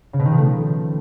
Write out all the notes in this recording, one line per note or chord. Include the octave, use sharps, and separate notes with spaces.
C#3
B2
D#3
F3
A3